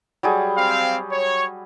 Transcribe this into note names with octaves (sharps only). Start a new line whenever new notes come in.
F#3 G3 G#4
C4 F5
C#5